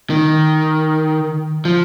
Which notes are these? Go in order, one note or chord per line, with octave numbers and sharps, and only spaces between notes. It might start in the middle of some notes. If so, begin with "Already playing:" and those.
D#3
F3